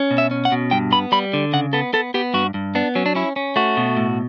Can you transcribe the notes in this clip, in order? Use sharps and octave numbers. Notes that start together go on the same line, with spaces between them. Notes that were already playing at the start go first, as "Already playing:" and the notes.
Already playing: C#4
B2
E5
C#4
F#5
B2
G2 G5
B3 B5
G3 B5
D3
C#3 F#5
B3 A4
B3 A4
B3 G4
G2 F#4
G2
B3 D4
F#3 C#4
D4
C#4 E4
C#4
A3 F#4
B2
A2